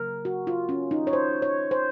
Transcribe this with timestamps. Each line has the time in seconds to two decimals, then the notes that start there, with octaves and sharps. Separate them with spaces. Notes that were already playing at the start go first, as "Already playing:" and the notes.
Already playing: C#3 F#3 A#3 A#4
0.25 F#4
0.47 F4
0.69 C#4
0.91 D#4
1.07 C#5
1.13 C5
1.42 C#5
1.71 C5